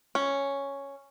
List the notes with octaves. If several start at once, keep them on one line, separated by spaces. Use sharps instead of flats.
C#4